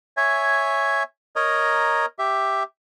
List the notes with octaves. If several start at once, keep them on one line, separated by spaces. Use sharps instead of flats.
C#5 E5 G#5
A#4 C#5 D#5 A#5
G4 E5